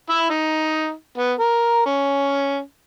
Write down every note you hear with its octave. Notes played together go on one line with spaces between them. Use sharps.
E4 E6
D#4
B3
A#4
C#4